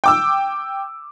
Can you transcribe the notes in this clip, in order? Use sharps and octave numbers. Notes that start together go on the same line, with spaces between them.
G5 D6 E6